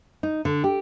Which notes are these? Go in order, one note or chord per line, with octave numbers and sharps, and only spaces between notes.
D#4
D3
G4